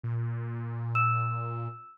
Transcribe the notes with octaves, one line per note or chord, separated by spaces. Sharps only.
A#2
E6 E7